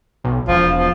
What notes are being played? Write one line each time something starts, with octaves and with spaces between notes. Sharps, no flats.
B1
E1 F3
F3